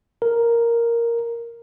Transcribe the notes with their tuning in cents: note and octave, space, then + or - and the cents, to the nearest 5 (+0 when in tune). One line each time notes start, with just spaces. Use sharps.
A#4 +0